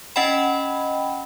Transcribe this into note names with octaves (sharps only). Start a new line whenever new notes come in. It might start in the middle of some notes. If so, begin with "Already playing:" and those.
C#4 D#5 F#5 G5 B5